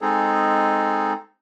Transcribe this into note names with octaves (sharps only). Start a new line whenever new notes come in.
G#3 C4 D#4 G#4 A4